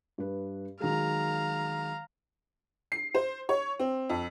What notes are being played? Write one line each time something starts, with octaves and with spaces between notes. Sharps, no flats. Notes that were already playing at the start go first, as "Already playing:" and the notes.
G2 B4
D#3 F#3 G#3 F5 A#5
C7
C5
C#5
C4
F2